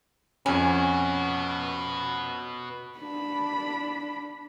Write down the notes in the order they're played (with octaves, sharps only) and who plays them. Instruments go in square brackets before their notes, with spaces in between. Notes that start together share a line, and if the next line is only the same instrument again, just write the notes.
[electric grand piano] F2 C#4 [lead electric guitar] B3 F#4 [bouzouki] G#5
[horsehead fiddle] D4 B5